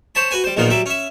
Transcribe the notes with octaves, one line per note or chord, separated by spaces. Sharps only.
C5 C#5 A5 B5
F#4 B4 G#5
G3 C5
A#1 D#2 A#2 D#3 B3 F5
F#3 G3 E5
C#4 E5